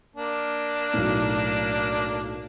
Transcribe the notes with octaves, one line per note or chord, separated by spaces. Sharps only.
A#3 D4
B1 A2